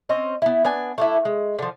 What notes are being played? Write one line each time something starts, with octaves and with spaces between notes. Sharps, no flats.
C4 C#4 D#5
B3 E4
B3 D4 G#5
A3 D4 E4
G#3
D3 F3